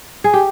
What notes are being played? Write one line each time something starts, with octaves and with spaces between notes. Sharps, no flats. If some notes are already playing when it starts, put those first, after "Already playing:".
G#4
G4